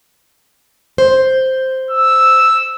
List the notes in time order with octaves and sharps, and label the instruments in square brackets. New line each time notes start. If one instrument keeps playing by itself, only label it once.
[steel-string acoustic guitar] C5
[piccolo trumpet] E6